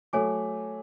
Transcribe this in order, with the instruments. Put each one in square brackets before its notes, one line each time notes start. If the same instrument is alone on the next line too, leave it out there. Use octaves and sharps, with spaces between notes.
[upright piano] F#3 A3 [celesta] A4 C#5 G#5 D6